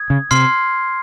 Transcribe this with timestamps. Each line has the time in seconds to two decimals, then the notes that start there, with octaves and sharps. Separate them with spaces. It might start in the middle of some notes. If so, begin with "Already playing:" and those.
Already playing: D#6 G#6
0.10 C#3
0.31 C3 C6 F6 C7